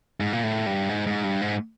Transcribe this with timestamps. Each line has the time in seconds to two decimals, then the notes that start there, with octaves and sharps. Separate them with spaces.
0.20 G#2
0.33 A#2
0.43 A2
0.66 G2
0.89 G#2
1.07 G#2
1.24 G2
1.41 G#2